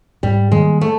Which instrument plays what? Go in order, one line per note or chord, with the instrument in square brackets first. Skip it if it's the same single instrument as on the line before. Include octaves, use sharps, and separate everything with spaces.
[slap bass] G#2 [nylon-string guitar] G3
[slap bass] D#3 G3 A#3 [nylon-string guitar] G#3
[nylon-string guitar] A3